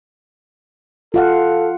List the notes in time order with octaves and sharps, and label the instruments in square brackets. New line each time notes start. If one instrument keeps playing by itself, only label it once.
[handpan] F4 F5 F#5 [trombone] A4